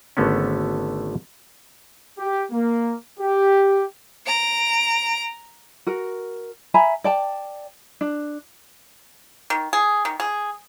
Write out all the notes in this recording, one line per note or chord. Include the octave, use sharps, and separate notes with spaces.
G#1 D3 A3 B3 C#4
G4
A#3
G4
A#5 D7
F#4 A#4
E5 G#5 A#5 B5
D5 G5 A5
D4
D#3
G#4
D#3
G#4